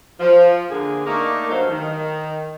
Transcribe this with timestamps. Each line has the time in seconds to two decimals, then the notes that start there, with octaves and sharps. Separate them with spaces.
0.20 F3
0.70 D3 A#3 G#4
1.06 A3 A#3 D4 D#4 A#4
1.50 G2 F#3 D#4 A4 C5 F5
1.71 D#3